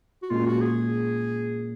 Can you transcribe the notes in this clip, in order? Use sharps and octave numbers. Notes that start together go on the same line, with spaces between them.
F#4
A#2 G#3 C#4 F4
F#4
G#4